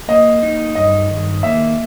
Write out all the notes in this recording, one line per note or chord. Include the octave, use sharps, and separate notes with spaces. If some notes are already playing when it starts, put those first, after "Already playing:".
A#3 D#5
D#4
G2 D#5
D#3
A#3 E5